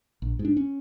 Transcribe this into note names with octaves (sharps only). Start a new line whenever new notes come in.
A#1
G#2
D4
C#4